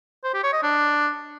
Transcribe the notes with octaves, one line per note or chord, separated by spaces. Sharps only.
C5
G4
C#5
D#5
D4